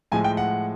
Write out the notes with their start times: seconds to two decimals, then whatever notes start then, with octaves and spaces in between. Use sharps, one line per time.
0.12 A2 F3 G#3 G#5
0.24 G5
0.37 F#5